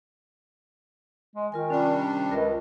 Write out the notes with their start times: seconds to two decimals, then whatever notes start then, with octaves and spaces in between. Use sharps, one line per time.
1.35 G#3
1.52 D#3 F4 A#4 G#5
1.70 C3 G3 C#4 D4 G5
2.32 C#2 A#4